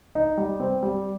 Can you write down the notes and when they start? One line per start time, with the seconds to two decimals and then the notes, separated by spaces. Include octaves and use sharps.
0.15 D#4
0.38 G3
0.60 C4
0.83 G3